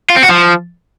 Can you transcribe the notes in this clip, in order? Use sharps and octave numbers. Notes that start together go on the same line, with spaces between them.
F4
C4
F#4
F3